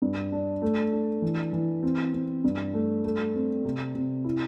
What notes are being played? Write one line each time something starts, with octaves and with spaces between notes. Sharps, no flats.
G2
D4
A3
D4
E3
E3
C4
C4
G2
A3
A3
C4
C3
C3
E4